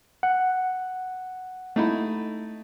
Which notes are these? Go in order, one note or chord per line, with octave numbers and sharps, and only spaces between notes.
F#5
A3 D#4 E4